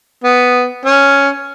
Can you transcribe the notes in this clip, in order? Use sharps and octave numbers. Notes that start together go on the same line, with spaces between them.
B3
C#4